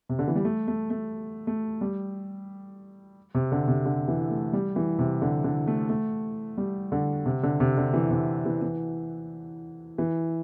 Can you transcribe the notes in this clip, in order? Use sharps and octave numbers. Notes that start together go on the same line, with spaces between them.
C3
D3
E3
G3
A3
A3
A3
A3
G3
C3
D3
C3
D3
E3
A3
G3
E3
C3
D3
D3
A3
A3
G3
D3
C3
D3
C3
D3
E3
C3
E3
E3
E3